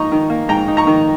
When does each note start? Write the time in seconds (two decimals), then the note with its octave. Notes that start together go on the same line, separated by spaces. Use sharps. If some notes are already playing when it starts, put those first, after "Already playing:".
Already playing: G#2 A#3 D#4 A#5 C#6
0.12 D#3
0.30 A#3
0.49 G#2 G5 A#5
0.68 D#4
0.77 A#5 C#6
0.87 D#3